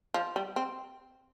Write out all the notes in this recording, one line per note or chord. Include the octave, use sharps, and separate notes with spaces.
F3
G3
C4